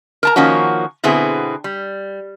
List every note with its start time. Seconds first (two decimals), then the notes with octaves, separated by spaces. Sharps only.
0.23 A#4 A5 A#5
0.36 D#3 F3 A#3 C#4 F#4
1.04 B2 D3 B3 C4 E4 G#4
1.64 G3